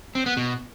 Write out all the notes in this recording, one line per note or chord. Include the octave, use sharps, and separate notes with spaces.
C4
B3
B2